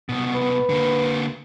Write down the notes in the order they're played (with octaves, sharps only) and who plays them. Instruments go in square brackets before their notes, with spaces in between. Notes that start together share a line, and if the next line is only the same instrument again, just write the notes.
[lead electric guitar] C2 B2
[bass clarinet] B4
[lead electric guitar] D3 A#3